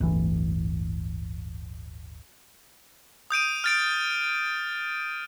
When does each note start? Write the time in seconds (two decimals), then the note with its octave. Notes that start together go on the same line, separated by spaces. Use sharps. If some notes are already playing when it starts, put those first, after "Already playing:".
0.01 D1 G1 E3
3.31 D#6 G6 D7 D#7
3.64 F6 A6 D7